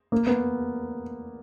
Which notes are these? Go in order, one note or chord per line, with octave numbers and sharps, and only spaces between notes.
A#3
B3